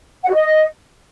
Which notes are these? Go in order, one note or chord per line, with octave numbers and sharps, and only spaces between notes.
F#5
F#4
D#5